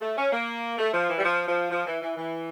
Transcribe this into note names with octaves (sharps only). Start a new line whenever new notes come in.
A3
C#4
A#3
A3
F3
E3
G3
F3
F3
F3
E3
E3
E3